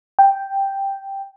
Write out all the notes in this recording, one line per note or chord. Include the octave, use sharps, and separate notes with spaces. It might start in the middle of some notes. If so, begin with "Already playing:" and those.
G5